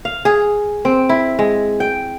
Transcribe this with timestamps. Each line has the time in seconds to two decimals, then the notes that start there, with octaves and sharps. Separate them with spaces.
0.05 F5
0.25 G#4
0.85 C4
1.09 E4
1.39 G#3
1.80 G5